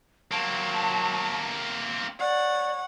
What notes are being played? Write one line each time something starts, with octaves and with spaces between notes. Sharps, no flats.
F#3 A#3 C4 A5
C#5 D5 F#5